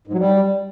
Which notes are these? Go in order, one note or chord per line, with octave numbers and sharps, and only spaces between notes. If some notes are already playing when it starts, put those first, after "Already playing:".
G#2
F#3
G3